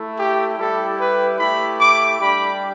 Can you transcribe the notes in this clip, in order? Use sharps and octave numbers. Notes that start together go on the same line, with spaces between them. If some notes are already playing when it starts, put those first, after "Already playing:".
Already playing: A3 E4
G4
G3 E4 G4 A4
B4
A3 E4 G4 B5
D6
G3 D4 G4 B5